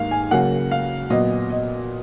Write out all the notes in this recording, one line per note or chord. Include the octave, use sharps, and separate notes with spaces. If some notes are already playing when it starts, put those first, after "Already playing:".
Already playing: G#2 D#3 A#3 F5
G#5
C#3 F#3 A#3 F#5
F5
A#2 F#3 B3 D#5
D#5